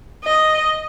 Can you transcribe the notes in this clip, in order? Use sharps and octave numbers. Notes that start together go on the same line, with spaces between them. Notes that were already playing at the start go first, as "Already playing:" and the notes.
D#5